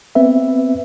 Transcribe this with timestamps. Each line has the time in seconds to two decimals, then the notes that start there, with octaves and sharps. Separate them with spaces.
0.15 B3 C4 B4 E5